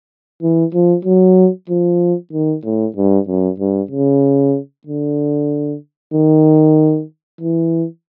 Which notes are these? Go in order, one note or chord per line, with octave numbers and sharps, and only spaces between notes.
E3
F3
F#3
F3
D#3
A2
G2
F#2
G2
C#3
D3
D#3
E3